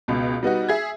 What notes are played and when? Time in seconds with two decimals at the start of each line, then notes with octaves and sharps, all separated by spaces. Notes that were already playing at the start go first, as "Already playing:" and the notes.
0.08 C#2 B2
0.43 G3 B3 D#4 F#4
0.69 G#4 E5 G#6